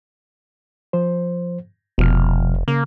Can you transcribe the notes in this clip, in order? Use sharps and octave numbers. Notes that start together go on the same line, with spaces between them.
F3 C5
F1 B2 F3 F6
C#3 A#3